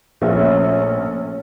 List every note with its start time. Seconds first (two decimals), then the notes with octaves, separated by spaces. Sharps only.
0.22 A#1 A#2 A3 C#4